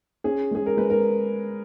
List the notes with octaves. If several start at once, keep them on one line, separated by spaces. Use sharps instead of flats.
C#4 G#4
G#3 G#4
A#4
G#3 B4
A#4